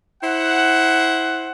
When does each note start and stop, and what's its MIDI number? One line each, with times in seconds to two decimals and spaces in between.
0.22 1.51 64
0.22 1.51 72
0.22 1.51 78